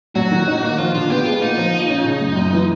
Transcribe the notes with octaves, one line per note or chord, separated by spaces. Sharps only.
F#3 F#4
D#3
D#4
A#3
F3 F4
D3 F4
B3 G4
G#3 F4
A#3 D#4
F3
F4
C#4
C#3
F#2
F#2
E3